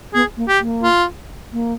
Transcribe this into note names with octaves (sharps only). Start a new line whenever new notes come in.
B3 G#4
A#3
G4
A#3
F4
A#3